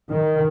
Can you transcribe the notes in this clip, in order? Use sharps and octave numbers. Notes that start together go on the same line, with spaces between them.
D#3